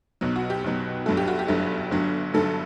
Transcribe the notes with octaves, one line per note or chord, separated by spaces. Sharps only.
B1 B2 F#3
F#4
G4
B1 B2 F#3
G1 G2 F#3 A3 A4
G4
F#4
G4
G1 G2 F#3 A3
G1 G2 D3 F#3 A3
G1 G2 D3 F#3 A3 A4